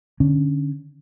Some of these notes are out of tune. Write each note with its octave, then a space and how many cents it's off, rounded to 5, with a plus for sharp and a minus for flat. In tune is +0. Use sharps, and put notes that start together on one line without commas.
D3 +10 C#4 +0